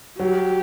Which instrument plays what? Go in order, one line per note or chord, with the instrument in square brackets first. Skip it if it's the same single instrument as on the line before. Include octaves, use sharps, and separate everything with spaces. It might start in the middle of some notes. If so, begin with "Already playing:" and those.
[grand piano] F#3 [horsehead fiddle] G4